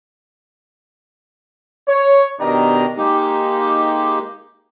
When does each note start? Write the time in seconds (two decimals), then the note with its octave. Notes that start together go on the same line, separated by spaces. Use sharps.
1.88 C#5
2.40 B2 D#3 D4 G4 D#5 A#5
2.96 G#3 A#3 D#4 G4